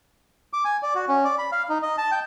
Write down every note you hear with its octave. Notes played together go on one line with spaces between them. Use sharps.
D6
G#5
D5
F#4
C#4
D5
B5
F5
D#4
D#5
A5
G5